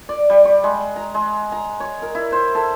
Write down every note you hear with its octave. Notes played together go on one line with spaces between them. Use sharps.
D5
G3
C#6
G#3
A#5
G#3
A#5
C#5
A#4
E4
C5
A4